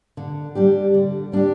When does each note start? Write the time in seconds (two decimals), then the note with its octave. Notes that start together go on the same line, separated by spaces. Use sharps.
0.17 D3
0.55 G3 D4 G4
0.94 D3
1.32 G3 D4 G4